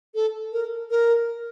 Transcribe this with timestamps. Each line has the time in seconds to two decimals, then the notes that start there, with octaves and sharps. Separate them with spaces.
0.15 A4
0.53 A#4
0.90 A#4